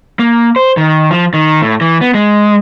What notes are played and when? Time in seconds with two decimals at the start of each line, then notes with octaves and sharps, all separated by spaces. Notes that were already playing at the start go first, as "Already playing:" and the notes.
0.19 A#3
0.56 C5
0.77 D#3
1.11 F3
1.33 D#3
1.62 A2
1.81 E3
2.01 B3
2.14 G#3